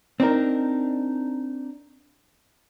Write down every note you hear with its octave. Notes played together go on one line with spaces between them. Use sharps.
C4 D4 D#4 A#4